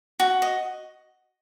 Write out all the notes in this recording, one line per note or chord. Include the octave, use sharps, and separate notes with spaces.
F#4
D#5